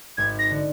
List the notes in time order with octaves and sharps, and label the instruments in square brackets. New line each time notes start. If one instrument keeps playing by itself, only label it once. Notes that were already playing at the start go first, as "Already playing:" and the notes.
[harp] G#1 [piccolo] G#6
[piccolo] A#6
[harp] D3